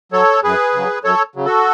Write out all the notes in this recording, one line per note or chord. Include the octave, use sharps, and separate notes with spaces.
F#3 A4 C#5
F#2 G#4 B4
C#3 F#3
F#2 A4 C#5
C#3 F#3
F#4 A4